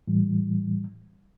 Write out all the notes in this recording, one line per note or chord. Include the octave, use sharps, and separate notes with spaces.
A2 E3 G3